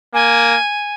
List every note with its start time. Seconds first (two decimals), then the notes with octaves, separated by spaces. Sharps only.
0.14 A#3 G#5